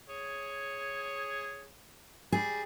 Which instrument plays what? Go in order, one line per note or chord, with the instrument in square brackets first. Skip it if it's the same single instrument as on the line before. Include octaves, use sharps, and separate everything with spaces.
[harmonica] G#4 C#5
[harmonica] G3 [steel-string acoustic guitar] G#4